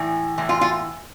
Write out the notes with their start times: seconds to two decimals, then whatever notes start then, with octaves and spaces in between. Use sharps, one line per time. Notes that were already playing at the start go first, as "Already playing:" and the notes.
Already playing: A2 E3
0.38 A2 E3
0.49 F4
0.61 F4